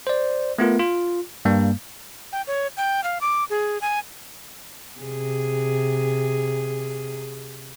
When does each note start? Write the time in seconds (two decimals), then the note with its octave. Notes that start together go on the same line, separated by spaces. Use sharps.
0.07 C5 D5
0.59 A3 B3 F4 A#4
0.79 F4
1.45 G2 G3 A#3
2.33 G5
2.47 C#5
2.77 G5
3.04 F5
3.21 D6
3.50 G#4
3.81 G#5
4.99 C3 G#4